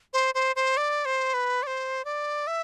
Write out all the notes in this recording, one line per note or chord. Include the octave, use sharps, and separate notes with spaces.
C5
C5
C5
D5
C5
B4
D5
C5
D5
E5